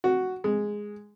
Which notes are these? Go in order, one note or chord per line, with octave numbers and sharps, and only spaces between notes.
F#4
G#3